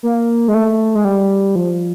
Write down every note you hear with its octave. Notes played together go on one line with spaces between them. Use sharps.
A#3
G#3
A3
G#3
G3
F3